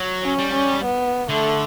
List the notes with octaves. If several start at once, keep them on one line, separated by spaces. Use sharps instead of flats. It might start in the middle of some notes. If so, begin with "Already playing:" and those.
Already playing: F#3
C#4
G3
C#4
B3
D3 A3